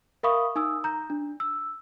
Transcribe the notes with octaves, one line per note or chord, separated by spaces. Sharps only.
A#4 E5 F5 B5 C#6 D#6
D#4 G#5 D#6 E6
A#5 G6
D4
E6